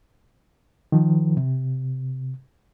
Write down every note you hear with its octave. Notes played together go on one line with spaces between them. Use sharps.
D#3 F3
C3